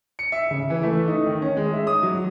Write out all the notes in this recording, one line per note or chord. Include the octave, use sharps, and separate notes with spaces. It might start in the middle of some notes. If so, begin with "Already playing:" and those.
C#7
E5
C#3
E3
A3
D#4
D#3
C#4
G#3
E5
D#6
F#3